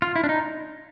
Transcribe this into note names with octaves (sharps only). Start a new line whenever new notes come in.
F4
E4
D4
D#4